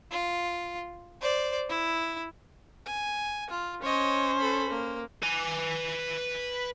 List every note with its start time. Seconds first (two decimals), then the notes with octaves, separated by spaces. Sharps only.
0.11 F4
1.21 C5 D5
1.69 E4
2.86 G#5
3.50 F4
3.83 C#4 C5 C#5 D#5
4.40 A4 B5
4.70 A#3
5.23 B4 G#5